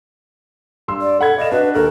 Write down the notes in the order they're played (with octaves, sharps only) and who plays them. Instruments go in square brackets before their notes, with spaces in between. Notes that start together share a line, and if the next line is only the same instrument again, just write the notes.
[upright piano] G2 C6 E6
[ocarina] D5
[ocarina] A4 [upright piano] F#5 B5 G#6
[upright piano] D5 F5 E7 [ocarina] D#5
[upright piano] D4 F#4 D#5 [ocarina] B4
[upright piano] D#2 A#4 F#6 [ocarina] A4